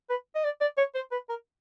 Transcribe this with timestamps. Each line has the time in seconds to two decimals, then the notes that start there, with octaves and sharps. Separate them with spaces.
0.10 B4
0.35 D#5
0.44 D5
0.61 D5
0.78 C#5
0.95 C5
1.12 B4
1.29 A#4